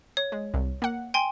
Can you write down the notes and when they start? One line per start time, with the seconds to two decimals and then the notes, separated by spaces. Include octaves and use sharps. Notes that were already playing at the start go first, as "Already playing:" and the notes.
0.17 C#5
0.32 G#3
0.54 C2
0.82 A#3 F#5
1.14 G5 G#5 C6